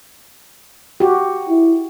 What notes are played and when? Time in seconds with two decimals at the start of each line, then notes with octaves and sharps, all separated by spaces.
1.00 F#4 G4
1.49 E4